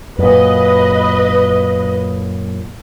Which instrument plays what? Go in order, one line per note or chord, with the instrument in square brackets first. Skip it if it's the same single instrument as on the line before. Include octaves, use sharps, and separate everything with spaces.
[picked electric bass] F#2 A#2 [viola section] B4 D#5